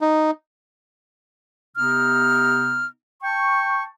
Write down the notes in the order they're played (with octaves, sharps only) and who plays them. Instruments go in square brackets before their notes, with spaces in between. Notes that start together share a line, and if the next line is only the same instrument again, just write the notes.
[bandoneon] D#4
[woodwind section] C3 B3 D#4 F6
G5 A5 C#6